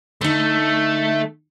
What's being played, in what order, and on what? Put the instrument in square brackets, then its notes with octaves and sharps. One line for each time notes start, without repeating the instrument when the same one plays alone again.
[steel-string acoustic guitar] D3 D#4 [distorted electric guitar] A3